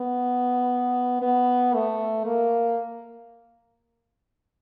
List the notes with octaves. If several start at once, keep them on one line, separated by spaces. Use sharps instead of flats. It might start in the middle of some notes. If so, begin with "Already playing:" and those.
Already playing: B3
B3
A3
A#3